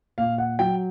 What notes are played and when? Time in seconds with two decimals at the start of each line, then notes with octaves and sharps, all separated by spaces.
0.18 A#2 F5
0.38 F#5
0.59 F#3 G5